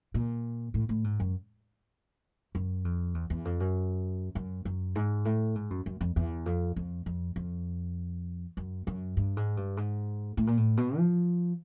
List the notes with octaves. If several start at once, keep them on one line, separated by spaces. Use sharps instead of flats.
A#2
A2
A2
G#2
F#2
F#2
F2
E2
E2
F2
F#2
F#2
F#2
G#2
A2
G#2
F#2
F#2
F2
E2
F2
F2
F2
F2
F#2
F#2
G2
G#2
G2
G#2
A2
A#2
A2
B2
F3